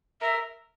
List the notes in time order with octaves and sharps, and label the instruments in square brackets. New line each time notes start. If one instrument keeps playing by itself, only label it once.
[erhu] A#4 [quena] E5